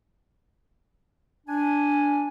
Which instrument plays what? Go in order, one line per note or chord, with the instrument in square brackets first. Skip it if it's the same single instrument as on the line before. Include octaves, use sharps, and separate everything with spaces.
[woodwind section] D4 G#5